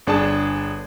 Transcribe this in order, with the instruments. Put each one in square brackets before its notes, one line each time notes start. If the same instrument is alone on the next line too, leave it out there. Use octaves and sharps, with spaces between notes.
[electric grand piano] G1 D4 G#4 A5